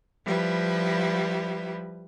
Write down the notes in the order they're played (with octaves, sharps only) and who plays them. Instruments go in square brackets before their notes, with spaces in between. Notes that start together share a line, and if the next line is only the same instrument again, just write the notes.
[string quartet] F3 G3 E4 B4